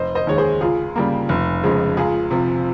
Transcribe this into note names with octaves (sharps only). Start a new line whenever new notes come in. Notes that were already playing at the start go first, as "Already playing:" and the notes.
Already playing: F1 C5 D#5
C5 D#5
D#2 D#3 G#3 C#5
G#4 C5
C#2 F4 G#4
C#3 G3 A#3
F1
F2 C#3 F3 G#3
C#2 F4 G#4
C3 F3